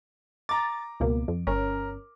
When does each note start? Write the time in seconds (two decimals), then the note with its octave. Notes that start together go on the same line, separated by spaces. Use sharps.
0.49 A#5 D6 A6
1.00 C#2 B2 A#3
1.28 F2
1.47 G1 C#4 A#4